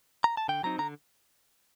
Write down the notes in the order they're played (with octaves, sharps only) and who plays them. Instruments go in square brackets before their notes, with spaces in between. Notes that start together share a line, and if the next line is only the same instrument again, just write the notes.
[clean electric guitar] A#5
A5
D3 G5
F#3 C4 D#4 A#5
D3 A#5